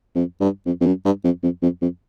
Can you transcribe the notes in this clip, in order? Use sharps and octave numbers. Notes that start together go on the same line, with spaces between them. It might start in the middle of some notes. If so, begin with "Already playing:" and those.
F2
G2
F2
F2
F#2
G2
F2
F2
F2
F2